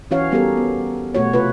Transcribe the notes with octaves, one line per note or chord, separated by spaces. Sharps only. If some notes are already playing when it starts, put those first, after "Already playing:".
E3 C#4 F#4 C#5 F5
G3 B3 F#4 G4 A4 A#4
B3
B2 A3 F#4 C#5
C3 F4 B4